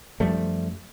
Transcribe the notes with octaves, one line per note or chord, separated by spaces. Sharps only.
F#2 F3 G3 A3